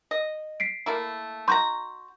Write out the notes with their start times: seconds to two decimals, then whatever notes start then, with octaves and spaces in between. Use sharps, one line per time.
0.11 D#5
0.60 B6 C7 D7
0.86 A3 A#3 E4
1.48 D#4 F#4 A#5 C6 C#6 G6